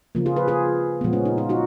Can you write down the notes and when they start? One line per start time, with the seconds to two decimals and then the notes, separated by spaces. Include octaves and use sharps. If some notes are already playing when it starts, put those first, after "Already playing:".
0.15 C#3 F3 A#3
0.26 F4 G#4
0.36 G#4 B4
0.48 F4 G#4
1.01 A#2 F3 G#3 B3
1.13 C#4
1.25 D#4
1.38 F4
1.49 D#4 F#4